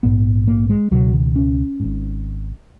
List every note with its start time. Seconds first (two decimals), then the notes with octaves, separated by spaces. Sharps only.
0.03 A#1 G#2 B3
0.47 A#3
0.70 G#3
0.91 C#2 B2 F#3
1.13 D#3
1.36 C#4
1.80 G#1 G#2